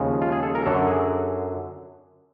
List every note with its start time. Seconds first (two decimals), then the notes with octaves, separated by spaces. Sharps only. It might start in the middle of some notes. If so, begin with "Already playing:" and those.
Already playing: D#2 C#3 F3 G#3
0.22 F4
0.32 G#4
0.43 A4
0.55 A#4
0.66 F#2 D3 F#3 A4
0.87 G#4